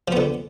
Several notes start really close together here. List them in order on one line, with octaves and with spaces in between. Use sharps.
F3 B3 D3